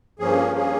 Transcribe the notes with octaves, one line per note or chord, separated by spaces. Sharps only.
G2 F3 A#3 C#4 G#4
G#4